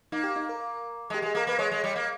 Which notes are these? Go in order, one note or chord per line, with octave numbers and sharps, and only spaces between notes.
A#3 D#4
G4
D#4
A#4
G#3
G4
G#3 G#4
A#3 A#4
A#3 B4
G#3 C#5
G#3
G3
A#3